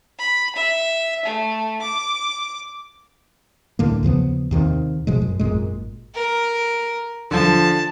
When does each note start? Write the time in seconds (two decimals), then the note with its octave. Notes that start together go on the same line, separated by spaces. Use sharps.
0.19 B5
0.55 E5
1.25 A3
1.82 D6
3.79 C#2 A2 D3 A#3
4.03 D#2 C#3 F3 B3
4.51 D#2 C3 D#3
5.07 G1 B2 F3 G#3
5.22 F#2
5.39 G#1 F#2 A#2 G#3
6.15 A#4
7.31 D3 F3 A5